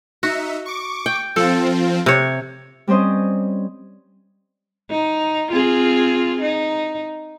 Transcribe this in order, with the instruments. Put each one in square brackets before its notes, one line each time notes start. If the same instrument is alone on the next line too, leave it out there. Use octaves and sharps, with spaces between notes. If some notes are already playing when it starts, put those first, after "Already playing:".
[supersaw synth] D#4 E5 [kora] F#4
[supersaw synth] C#6 D6
[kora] G5
[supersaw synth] F3 C4 F4 [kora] A4
[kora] C3 C#5
[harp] G3 C4 C#4 C5 D#5
[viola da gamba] D#4
C4 F4 G#4
D#4